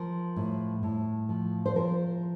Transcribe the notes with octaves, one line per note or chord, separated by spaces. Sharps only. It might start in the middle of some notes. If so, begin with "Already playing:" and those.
Already playing: F3 A#4
A2
A2
F3
C5
F3 A#4